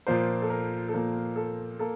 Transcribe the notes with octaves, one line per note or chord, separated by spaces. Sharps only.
A#2 F3 A#3 C5
A4
A#4
A4
A#2 F3 A#3 A#4
A4
A#3 A4